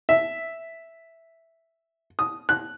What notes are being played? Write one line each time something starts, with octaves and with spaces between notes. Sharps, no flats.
E5
D#6
F#6